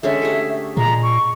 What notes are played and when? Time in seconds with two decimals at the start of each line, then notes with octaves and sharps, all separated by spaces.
0.03 D3 G#3 C#4 E5
0.22 A3 G4 G#4
0.77 A#2 G#3 A#5
1.02 C#6